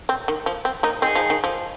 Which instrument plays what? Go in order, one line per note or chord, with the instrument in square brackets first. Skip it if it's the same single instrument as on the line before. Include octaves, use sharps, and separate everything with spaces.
[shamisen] C4
D#3
F3
C4
A#3 D#4
[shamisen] C4 [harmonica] D#4 G#4
[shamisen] F3
D#3
F3